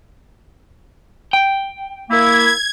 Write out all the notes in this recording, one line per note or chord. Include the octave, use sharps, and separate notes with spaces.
G5
A#3 E4 G#6